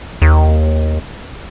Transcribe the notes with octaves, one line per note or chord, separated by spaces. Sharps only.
D#2